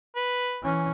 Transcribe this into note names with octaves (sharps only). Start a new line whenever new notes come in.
B4
E3 C#4